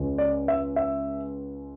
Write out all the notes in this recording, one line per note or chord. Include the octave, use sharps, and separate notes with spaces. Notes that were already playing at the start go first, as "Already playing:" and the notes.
Already playing: C#2 C#3 G#3
D5
E5
E5